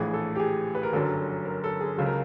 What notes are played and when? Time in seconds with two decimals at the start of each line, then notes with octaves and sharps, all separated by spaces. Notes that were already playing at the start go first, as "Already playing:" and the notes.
Already playing: A#1 A2 E3 G#4
0.13 A4
0.35 G4
0.40 G#4
0.75 B4
0.83 A#4
0.93 G1 F#2 D3 F#3 A4
1.45 A#4
1.64 A4
1.81 G#4
1.98 C#2 C#3 F#3 A4
2.06 A#4